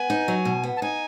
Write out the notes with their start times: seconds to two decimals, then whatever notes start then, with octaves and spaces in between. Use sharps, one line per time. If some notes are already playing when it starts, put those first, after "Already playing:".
Already playing: B3 G#5
0.10 D#4
0.28 F#3
0.45 B2
0.64 B3
0.77 A5
0.82 D#4 G#5